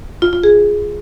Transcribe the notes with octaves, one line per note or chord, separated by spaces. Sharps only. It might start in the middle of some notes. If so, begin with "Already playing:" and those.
F4
F4
G#4